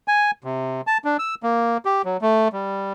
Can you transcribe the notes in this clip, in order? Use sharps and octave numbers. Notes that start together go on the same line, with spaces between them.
G#5
C3
A5
D4
E6
A#3
G4
F#3
A3
G3